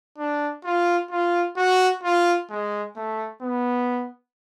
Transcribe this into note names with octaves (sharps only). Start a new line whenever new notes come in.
D4
F4
F4
F#4
F4
G#3
A3
B3